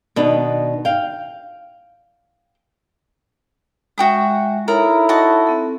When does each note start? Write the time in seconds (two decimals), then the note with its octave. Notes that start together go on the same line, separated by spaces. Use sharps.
0.16 B2 D#3 B3 D4 D#4
0.85 F5 G5
3.98 G#3 F#4 E5 G5 D#6
4.68 D#4 E4 A4 A#4 C#5
5.09 F#4 D#5 A5
5.47 C4 A4